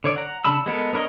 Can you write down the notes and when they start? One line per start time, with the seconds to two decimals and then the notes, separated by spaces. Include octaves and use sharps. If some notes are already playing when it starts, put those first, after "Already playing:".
0.04 D3 C#5 D5
0.16 F#5 A#5
0.44 C#3 D4 A5 B5 E6
0.66 G#3 B3 A4 A#4
0.93 B3 D4 A#4 C#5 D#5